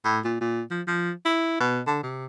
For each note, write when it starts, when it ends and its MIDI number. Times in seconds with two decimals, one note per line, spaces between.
0.04 0.19 45
0.24 0.39 46
0.41 0.62 46
0.71 0.81 53
0.87 1.11 53
1.25 1.59 64
1.60 1.81 47
1.87 2.02 50
2.03 2.26 48